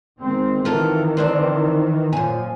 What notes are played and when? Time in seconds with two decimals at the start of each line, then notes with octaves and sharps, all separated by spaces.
0.20 D#3 G#3 C4
0.65 D#3 E3 F4 A4 A#4
1.17 C4 D4 C5
2.13 F#2 A#2 F3 G#5